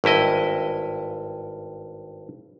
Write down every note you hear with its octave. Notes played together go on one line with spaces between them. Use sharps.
G#1 G2 E4 D#5